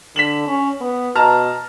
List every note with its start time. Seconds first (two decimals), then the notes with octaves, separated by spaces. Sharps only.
0.16 D3 B6 E7 F#7
0.47 C#4
0.81 B3
1.16 B2 A5 A#5 F6